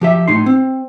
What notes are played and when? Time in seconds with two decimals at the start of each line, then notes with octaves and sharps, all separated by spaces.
0.01 F3 G4 E5
0.28 A2 D#4 C6
0.46 C4